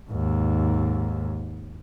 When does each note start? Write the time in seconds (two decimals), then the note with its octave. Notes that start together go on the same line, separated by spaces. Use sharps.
0.10 D#2 G#2